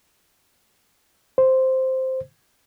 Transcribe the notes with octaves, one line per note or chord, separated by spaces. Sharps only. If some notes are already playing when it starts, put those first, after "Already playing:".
C5